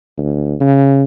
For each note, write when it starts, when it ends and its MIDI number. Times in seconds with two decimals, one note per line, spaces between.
0.18 0.55 38
0.60 1.04 49